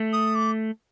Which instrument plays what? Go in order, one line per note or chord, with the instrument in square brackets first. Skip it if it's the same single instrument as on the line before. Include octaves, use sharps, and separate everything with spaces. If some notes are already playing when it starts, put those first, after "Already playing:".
Already playing: [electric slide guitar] A3
[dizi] D#6
D6